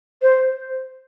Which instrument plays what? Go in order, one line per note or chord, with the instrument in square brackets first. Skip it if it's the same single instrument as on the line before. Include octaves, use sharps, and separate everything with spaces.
[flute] C5